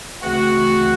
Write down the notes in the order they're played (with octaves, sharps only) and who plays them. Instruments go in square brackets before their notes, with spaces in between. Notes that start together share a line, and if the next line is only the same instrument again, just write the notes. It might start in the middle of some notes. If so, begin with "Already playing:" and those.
[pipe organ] D2 C#3 E3 A3 C4 [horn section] F#4